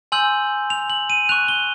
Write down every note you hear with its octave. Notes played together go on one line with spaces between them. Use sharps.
G#5 C6 E6 G6 F#7
F7
F#7
D#7
C#6 F#6 F7
G7